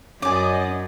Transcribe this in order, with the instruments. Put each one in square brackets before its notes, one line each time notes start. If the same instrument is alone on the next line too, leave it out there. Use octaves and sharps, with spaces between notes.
[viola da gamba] F#2 [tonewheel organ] C#4 [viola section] D5 D#5 [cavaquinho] G#5 D6